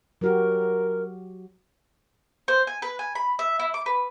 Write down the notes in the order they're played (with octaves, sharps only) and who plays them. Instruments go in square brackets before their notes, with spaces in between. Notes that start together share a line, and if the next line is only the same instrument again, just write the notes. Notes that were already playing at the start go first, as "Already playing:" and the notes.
[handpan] F#3 F#4 G4 [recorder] A#4
[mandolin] C5
G#5
B4
G#5
B5
E5
E4
D6
B4